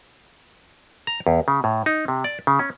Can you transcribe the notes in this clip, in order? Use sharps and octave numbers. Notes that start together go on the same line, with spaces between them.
A#5
E2
C#3
A2
D#4
C3
D5
C#3
C#4